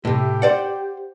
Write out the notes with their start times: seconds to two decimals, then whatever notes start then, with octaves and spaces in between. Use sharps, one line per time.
0.05 A2 C3 G4
0.42 C5 D5 F#5